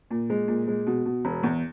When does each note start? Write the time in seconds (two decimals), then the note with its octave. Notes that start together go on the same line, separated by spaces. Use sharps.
0.11 A#2
0.30 G#3
0.48 A#2
0.68 G#3
0.87 B2
1.05 B2
1.25 E1
1.43 E2